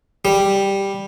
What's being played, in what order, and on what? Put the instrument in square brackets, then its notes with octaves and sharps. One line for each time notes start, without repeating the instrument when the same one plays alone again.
[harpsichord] G3